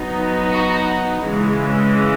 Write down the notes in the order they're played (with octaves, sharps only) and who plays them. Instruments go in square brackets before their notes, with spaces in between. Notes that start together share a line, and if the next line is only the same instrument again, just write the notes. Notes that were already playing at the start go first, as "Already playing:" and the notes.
Already playing: [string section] F#3 B3 D#4
F#4
C#3 E3 G#3